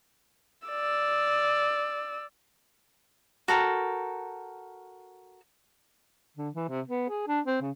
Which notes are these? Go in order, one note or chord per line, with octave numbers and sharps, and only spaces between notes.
D5 E6
F#4 A4 A#4 G5
D3
E3
C3
B3
G#4
D4
C4
C#3